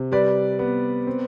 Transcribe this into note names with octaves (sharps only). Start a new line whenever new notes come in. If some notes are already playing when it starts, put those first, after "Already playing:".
Already playing: C3
G3 B4 D5
B3
C4